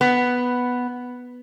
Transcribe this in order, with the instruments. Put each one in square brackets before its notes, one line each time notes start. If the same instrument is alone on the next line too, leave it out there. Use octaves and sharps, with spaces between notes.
[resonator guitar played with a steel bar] B3